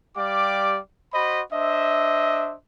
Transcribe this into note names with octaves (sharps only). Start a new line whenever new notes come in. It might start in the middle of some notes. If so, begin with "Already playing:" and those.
G3 G4 D5 F5 D6
F#4 C5 D#5 B5
D4 C5 D#5 E5